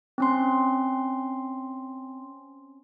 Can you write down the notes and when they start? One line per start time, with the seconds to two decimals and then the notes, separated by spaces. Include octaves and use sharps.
0.18 C4 C#4 C6